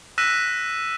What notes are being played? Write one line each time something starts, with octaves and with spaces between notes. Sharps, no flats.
E6 F#6 A#6 B6 D#7 E7